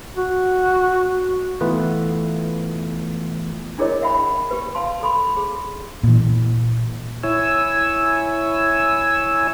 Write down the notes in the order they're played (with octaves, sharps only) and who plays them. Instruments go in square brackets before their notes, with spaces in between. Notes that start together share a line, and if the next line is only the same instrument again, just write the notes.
[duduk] F#4
[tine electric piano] E3 A3 B3 F4 B4
[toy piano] D4 E4 G#4 A#4 C#5 D#5
E5 F#5 G5 B5
G4 B4
F5 A5 C6
A4 B5 C6
G#4
[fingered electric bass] A#2 E3
[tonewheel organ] E4 C#5 G#5 E6